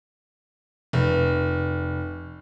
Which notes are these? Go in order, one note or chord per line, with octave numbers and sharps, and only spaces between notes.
F1